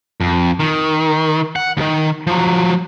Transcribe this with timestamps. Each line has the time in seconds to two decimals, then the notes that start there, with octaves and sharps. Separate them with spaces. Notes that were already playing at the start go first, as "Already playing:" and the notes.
0.21 F2
0.60 D#3
1.56 F#5
1.77 D#2 D#3
2.27 F3 F#3